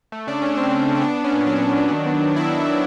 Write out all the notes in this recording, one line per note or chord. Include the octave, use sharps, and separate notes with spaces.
A3
C#3 D4
A3 C#4
A3 C4
A3
C#3
C#4
B3 D4
B3 D4
C#4
A#2
F#3 D4
B3
F#3
D#3
B3
D#3
D#3 E4
F#3
F#3